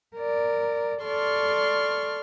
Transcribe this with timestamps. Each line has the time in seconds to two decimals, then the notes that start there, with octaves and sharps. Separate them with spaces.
0.15 A#4 D5
1.03 A4 D5 C6 C#6 F6